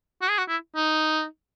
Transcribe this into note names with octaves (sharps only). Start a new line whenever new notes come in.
F#4
G#4
F#4
E4
D#4